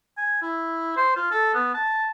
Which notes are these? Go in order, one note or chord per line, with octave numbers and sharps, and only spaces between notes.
G#5
E4
C5
F4
A4
B3
A5